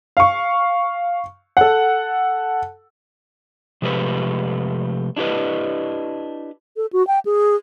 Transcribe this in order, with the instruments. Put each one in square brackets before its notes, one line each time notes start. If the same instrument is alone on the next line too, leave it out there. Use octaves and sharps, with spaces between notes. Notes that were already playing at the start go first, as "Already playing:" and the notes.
[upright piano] F5 C#6
A4 F#5
[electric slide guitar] C3 F3 G#3 A3 G4 B4
D4 E4 G4 B4 D#5
[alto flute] A4
F#4
G5
G#4